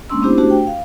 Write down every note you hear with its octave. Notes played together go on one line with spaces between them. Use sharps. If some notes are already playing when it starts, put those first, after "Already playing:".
G#3 A#3 C#4 D4 C6 E6
B3 C#4 D4 E4 G4 C5
A3 D4 F#4 G4 C5
G5
F5